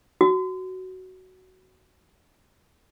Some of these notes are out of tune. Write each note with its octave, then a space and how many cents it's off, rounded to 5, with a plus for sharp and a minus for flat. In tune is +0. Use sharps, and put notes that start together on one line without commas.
F#4 +10